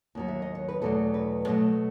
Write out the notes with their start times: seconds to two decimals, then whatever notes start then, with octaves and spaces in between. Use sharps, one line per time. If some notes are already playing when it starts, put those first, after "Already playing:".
0.15 D#2 D#3 F#3
0.28 E5
0.42 D#5
0.55 C#5
0.69 B4
0.82 E2 B2 F#3 A3 A4
1.14 B4
1.47 B2 F#3 A3 D#5